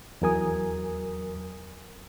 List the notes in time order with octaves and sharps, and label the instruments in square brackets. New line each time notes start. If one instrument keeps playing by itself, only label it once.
[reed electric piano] E2 F#3 A#4 G#5 D#6